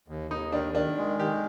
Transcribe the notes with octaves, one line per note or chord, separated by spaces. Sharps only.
D#2
D#2 D#4
D#3 D4
D#3 D4
G#3
D#3 G4